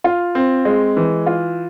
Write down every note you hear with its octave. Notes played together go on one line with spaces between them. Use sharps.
F4
C4
G#3
E3
F4